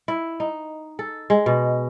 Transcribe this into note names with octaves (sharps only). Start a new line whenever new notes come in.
E4
D#4
A4
G#3
B2